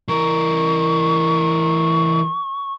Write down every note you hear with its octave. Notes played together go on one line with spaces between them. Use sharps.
E3 A#4 C#6